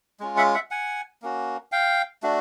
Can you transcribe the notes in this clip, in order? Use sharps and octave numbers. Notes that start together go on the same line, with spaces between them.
G#3 C#4 F4
E5 F#5
E5 F#5
F#5 G#5
A#3 C#4 F#4
F5 G5
A3 D4 F#4